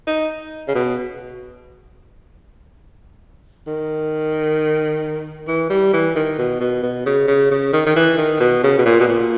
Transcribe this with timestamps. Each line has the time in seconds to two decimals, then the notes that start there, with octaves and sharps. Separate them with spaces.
0.07 D#4
0.68 C#3
0.75 B2
3.67 D#3
5.48 E3
5.70 G3
5.93 E3
6.16 D#3
6.38 B2
6.61 B2
6.83 B2
7.06 C#3
7.28 C#3
7.51 C#3
7.73 D#3
7.86 D#3
7.96 E3
8.18 D#3
8.40 B2
8.64 C#3
8.79 B2
8.86 A#2
9.01 B2
9.08 A#2